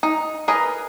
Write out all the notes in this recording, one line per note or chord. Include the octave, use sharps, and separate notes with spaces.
D#4
G#4 A#4 B4 D#5